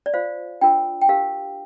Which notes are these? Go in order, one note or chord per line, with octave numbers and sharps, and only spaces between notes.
D5
F4 C5 F5
D4 F4 A#4 G5
G5
D4 G4 A#4 F5